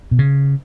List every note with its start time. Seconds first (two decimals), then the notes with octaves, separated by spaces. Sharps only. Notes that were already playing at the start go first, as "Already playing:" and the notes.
0.11 B2
0.19 C#3